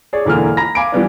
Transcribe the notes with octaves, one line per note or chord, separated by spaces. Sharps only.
G#4 C#5 D5
E1 D3 E3 A#3 F6
A#5 B5 A#6
F5 G#5 B5 D6 D7
E3 G3 B3 D4